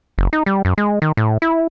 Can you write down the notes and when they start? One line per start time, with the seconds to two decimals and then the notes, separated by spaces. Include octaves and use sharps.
0.18 F#1
0.33 D#4
0.46 G3
0.65 F#2
0.78 G#3
1.02 D#3
1.17 A2
1.42 E4